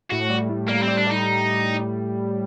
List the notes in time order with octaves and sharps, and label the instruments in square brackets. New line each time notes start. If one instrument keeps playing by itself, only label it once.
[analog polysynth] A2 [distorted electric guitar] F#4
[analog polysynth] G3
A2
[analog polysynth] G3 [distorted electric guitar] A#3
[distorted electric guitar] C4
[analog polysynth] G3
[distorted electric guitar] D4
[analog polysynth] G3 [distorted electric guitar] D#4